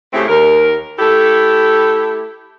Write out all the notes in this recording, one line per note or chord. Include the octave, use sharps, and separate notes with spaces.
A2 C#3 A3 C4 E4 G4
D#2 A#4
A3 E4 G4 A4